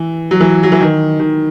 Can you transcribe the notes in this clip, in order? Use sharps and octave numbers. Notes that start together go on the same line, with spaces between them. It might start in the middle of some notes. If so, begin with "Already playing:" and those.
Already playing: E3
F#3
E3
F#3
E3
D#3
D#3